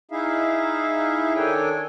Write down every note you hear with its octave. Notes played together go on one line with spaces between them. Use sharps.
D#4 E4 G#4 E5 F5
D#3 D4 A4 C#5 G5 G#5